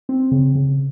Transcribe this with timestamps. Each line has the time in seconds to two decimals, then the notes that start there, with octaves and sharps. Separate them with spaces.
0.09 C4
0.32 C#3
0.55 C#3